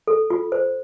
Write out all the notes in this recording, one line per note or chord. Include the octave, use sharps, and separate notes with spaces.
A4
F4
C5